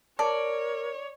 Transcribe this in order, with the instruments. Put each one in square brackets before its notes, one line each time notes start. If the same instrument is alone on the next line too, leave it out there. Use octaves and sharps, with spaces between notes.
[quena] A#4 [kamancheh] C#5 [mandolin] D5 [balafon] A5